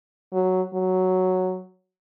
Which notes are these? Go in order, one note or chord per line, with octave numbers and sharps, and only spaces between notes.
F#3
F#3